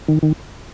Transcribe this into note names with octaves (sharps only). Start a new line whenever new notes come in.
D#3
D#3